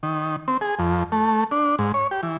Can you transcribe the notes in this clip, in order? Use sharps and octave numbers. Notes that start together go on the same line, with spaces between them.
D#3
C4
G#4
F2
A3
D4
G#2
C#5
G4
E3